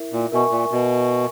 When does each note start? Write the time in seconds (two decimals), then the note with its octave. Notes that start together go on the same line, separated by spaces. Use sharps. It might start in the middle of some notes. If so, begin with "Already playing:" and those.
Already playing: E4 A#4 E5
0.13 A#2
0.32 B2 A#4 E5 G#5 C#6
0.51 A#2
0.71 B2